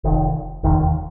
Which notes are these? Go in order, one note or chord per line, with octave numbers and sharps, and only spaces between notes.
F1 F2 D#3
F1 D#2 D#3